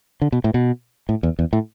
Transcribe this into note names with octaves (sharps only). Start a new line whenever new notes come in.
D3
B2
A2
B2
A2
E2
E2
A2